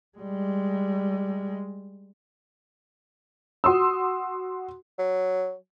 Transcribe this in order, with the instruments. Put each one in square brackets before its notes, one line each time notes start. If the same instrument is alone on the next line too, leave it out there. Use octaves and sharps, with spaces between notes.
[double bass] G3 G#3
[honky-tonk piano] F#4 C6 D#6 E6
[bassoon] F#3